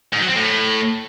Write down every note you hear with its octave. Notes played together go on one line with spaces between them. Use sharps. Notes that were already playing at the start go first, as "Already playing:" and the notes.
G#2
F#3
C4
A2